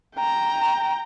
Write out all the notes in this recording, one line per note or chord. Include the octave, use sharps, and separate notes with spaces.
G5 A#5